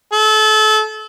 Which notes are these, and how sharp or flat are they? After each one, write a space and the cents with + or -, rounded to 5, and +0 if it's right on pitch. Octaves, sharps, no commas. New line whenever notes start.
A4 -30